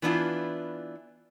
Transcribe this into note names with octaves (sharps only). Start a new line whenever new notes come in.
E3 B3 D4 E4 F4